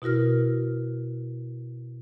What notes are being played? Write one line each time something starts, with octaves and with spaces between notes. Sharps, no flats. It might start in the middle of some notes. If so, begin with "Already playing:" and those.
B2 E4 F#4 A#4 F6